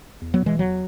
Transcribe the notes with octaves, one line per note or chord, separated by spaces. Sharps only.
E2
F#3 B3
B2
E3 G#3
E2 F#3